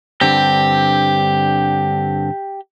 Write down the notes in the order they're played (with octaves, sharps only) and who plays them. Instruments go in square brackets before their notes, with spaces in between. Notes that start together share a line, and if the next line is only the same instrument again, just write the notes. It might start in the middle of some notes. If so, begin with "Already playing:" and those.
[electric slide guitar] G2 D3 C4 [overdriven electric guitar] G4